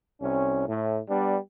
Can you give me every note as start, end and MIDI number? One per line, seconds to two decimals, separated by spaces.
0.21 0.63 36
0.21 0.63 61
0.67 0.98 45
1.09 1.36 55
1.09 1.36 59
1.09 1.36 62